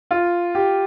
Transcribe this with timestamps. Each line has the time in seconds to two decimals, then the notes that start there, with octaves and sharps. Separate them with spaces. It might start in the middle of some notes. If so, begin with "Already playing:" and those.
0.11 F4
0.55 G4